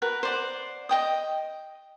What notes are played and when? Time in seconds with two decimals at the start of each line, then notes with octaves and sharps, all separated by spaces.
0.02 F#4 A#4 B4
0.23 C5 D5 F#5
0.89 D#5 G5 D#6